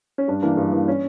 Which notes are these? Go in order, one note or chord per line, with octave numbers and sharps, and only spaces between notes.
C#4
G2 D4
E3 A#3 D4
G2
E3 A#3
C#4